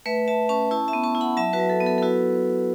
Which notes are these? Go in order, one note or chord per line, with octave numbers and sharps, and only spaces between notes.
A3 B4 E5
A3 E5 A5
C#4 A5 C#6
E4 A5 C#6
E5 A5
B3
A5 C#6
E4
F#5 B5
F#3 E5 A5
F#4 B4
F#3
A4
B3
A4
A4
E4 F#4 B4